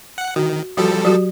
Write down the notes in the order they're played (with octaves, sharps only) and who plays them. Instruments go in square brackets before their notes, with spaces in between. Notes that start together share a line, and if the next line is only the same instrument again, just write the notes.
[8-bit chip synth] F#5
[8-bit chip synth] D#3 [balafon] F#4
[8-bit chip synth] F3 G3 A4 [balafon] F#4
[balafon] F#3 F#4 G4